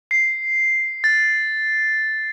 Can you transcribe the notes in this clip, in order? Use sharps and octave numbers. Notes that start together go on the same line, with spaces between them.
C7
A6